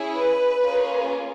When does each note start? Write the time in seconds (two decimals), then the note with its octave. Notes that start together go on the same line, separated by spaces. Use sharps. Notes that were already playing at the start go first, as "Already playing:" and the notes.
Already playing: C#4 E4 G#4
0.16 B4
0.61 A#3 C#4 F4 G#4